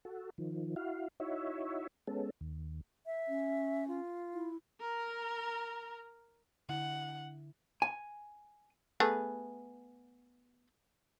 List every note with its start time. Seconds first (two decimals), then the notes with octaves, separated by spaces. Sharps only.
0.05 F#4 A4
0.38 D#3 F3
0.76 E4 F#4 F5
1.20 D#4 E4 F#4 C#5 E5
2.07 G#3 B3 C#4 A4
2.41 D#2
3.06 E5
3.28 C#4
3.88 F4
4.34 E4
4.80 A#4 A#5
6.69 D3 E4 F#5
7.82 G#5
9.00 A3 B3 G#4